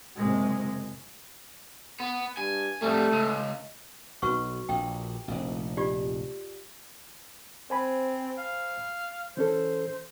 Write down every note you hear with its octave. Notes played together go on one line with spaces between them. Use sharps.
F#1 C3 G#3
B3
G2 G#5
F2 G3 A3
C#2
B1 F#4 B4 C#6
A#1 G5
F1 A#1
F4 G4 D5
C4 C5 G#5 B5
F5
E3 C#4 A4 C5